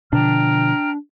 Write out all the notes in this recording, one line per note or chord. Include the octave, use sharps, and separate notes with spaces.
B2 D3 F3 D4 G5 A#5 F6